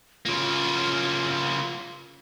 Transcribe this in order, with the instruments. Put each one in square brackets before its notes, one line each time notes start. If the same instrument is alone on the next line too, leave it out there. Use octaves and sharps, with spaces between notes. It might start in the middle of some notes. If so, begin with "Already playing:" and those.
[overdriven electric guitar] C#3 A#3 [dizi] F4